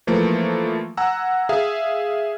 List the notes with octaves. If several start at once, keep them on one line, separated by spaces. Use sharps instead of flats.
E3 F3 A3 A#3
F#5 G#5 A#5 E6
G#4 E5 F5